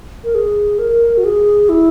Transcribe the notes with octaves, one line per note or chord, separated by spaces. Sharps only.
A#4
G#4
A#4
F#4
G#4
E4